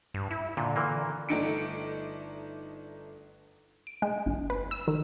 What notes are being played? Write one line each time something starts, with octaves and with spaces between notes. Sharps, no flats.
G2
E4
A#2 D3
A#2 E3 A#3
G1 A3 D4 D#4 C#7 D7
D7
G#3
G1
B4
E6
D#3